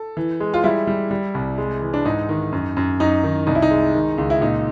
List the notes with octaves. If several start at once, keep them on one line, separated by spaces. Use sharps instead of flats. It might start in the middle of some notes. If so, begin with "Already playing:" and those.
Already playing: A4
E3
G#3
F4
G3 E4
G3
G3
C2
G#3
E3
D4
G#2 D#4
D#3
F#2
F#2
F#2 D#4
D#3
C2 D#4
E4
D#4
G#3
D#3
C#2
E4
A#2 D#4